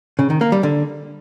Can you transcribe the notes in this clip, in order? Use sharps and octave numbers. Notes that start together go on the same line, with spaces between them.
C#3
D#3
A#3
G3
D3